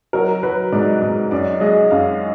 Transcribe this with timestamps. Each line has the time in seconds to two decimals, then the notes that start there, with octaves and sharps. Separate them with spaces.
0.13 F#3 A#4
0.43 F#3 B4
0.72 G#2 D5
1.02 G#2
1.31 F#2 D5
1.61 G#3 D#5
1.91 F#2 F5